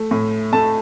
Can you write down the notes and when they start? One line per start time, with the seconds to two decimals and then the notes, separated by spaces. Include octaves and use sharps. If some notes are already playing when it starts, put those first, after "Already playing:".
Already playing: A3
0.11 A2
0.53 A3 A5